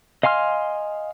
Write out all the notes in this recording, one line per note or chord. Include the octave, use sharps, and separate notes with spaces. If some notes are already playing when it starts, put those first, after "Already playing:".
D#5 F5 G#5 C6 F6